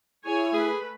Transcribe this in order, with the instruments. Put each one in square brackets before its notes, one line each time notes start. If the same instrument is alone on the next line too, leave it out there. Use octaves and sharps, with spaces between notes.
[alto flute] E4 [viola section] G#4 C#5 G#5
[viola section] A3 B4 [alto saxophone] G#4